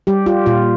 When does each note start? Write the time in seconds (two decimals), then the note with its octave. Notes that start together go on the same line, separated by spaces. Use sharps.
0.07 G3 G4
0.26 F4 G4
0.46 A#2 F4